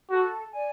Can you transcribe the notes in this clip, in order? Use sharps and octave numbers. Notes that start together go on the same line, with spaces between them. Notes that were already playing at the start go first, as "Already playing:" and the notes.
F#4 A4
D5 G#5